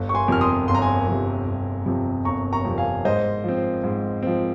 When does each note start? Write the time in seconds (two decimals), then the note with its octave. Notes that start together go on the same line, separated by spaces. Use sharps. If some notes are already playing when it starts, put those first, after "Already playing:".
Already playing: G1
0.09 C#6
0.15 G#5 C6
0.28 F2 C3 F6
0.41 C6 D#6
0.68 G1 C6
0.75 A#5
0.82 G#5 C6
1.07 F2 C3
1.47 G1
1.86 F2 C3
2.25 G1 A#5 C#6
2.53 A#5 C#6
2.65 F2 C3
2.78 F5 G#5
3.05 G#2 C5 D#5
3.44 F3 C4
3.84 G#2
4.22 F3 C4